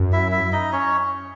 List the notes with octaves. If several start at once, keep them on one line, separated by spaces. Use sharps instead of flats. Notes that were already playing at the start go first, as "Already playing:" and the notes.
Already playing: F#2
E4 E5
E4 E5
D#4 D#5
C#4 C#5